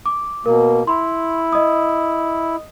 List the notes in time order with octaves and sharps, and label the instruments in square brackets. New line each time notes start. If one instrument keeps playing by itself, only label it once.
[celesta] D6
[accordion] B2 A#3 [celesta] A#4
[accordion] E4 [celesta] B5 C6
[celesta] D#5 D#6